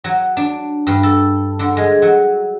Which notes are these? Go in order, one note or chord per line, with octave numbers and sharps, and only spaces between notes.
F#3
D4
G2
A4
D3
G#3
F#3